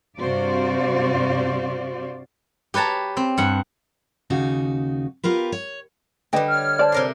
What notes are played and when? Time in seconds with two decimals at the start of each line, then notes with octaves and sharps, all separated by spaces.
0.19 G2 C3 F#4 C5 D5 F5
2.74 G4 B4 C#5 A5 A#5
3.17 C4
3.38 G2 F#5
4.30 D#2 C#3 D#4 F#4
5.23 B3 F4 G4 A#4 B4
5.52 C#5
6.33 D3 G3 B4 D#5 G5
6.49 C#5 F6
6.79 C5 D5 A5
6.92 C3 A#4 C6